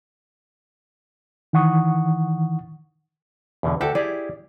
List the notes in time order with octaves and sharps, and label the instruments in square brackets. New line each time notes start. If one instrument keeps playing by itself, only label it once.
[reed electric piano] D#3 E3 F#5 C#6 D#6
[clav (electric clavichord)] E2 B2 D3
[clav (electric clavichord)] D2 [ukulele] F#4 G4 A4
[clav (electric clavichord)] E4 G4 G#4 [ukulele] D5